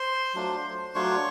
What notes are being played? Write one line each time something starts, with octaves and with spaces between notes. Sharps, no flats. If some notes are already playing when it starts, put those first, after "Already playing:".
Already playing: C5 C6
F#3 A3 D4 F4
F#3 A3 D4 F4 C#5 C#6